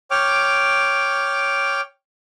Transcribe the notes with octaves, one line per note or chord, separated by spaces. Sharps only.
C#5 G5 D6 F6